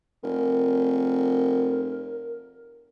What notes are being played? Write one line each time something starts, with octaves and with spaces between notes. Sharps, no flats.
F1 A#4